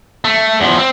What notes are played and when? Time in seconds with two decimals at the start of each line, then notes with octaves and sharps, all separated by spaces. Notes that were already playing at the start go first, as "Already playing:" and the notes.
0.24 A3
0.61 E2 F3
0.78 C4